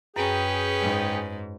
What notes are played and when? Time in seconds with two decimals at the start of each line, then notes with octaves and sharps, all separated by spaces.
0.16 F#2 C#4 G#4 B4 G5
0.81 G#2